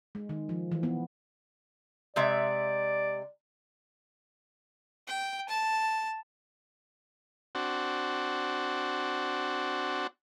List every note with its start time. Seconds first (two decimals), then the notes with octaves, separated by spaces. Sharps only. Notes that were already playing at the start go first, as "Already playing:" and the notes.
0.15 G#3
0.29 D#3
0.49 F3
0.71 E3
0.83 B3
2.16 C3 G#3 D5 E5
5.07 G5
5.49 A5
7.55 C4 D4 F#4